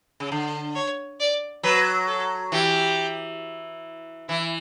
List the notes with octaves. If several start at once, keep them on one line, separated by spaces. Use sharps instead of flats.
C#3
D3
C#5
D5
F#3 B4
A4
E3 G4
E3 E4